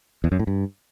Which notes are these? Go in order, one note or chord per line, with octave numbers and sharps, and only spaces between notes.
E2
F#2
A2
G2